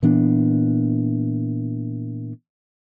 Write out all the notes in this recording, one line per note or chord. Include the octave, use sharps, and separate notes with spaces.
A#2 E3 B3 D4